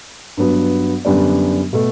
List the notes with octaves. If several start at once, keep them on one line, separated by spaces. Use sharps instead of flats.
G2 F#3 B3
F#2 D3 G3 B3 D4
B2 A3